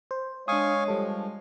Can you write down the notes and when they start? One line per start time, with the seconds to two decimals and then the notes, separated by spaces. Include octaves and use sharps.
0.11 C5
0.48 G#3 D4 C#5 F5 G#5 C#6 D#6
0.88 F3 G3 A4